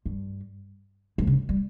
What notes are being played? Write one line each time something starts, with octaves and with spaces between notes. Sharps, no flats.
G2
F#2
C#3
G3